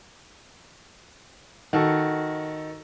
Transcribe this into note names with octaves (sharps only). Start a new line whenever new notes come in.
D#3 F#4 A4